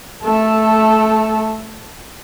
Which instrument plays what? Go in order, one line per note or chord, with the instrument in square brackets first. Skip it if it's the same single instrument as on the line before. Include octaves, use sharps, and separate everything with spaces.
[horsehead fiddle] A3 A4